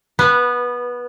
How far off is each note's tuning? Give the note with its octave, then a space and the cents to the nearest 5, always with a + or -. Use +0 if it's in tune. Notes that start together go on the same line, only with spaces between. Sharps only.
B3 -15 B4 +0